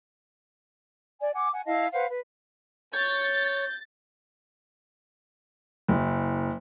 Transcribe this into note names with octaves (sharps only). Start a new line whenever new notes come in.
D5 G#5
F#5 G#5 D6
F#5 G#5
E4 D#5 F5 A5
B4 C5 F5 F#5
B4
C#5 G6 A6
F#1